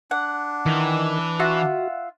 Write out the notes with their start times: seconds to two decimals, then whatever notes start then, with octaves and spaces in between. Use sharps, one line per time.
0.11 D4 F#5
0.66 D#3 E3
1.40 F4 F#4 E5 F#5